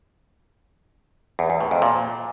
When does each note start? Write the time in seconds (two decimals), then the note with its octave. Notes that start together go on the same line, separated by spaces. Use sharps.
1.39 E2
1.50 E2
1.60 A2
1.71 F2
1.82 A#2